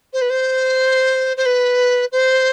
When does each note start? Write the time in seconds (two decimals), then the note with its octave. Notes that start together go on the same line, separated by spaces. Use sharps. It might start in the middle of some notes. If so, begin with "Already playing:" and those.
0.13 C5
0.21 B4
0.30 C5
1.37 C5
1.45 B4
2.12 C5